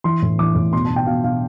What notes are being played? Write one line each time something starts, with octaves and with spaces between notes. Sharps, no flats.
E3 C6
A2
E3 D6
A2
B2 C6
A5
B2
G5
B2 F5
B2 F5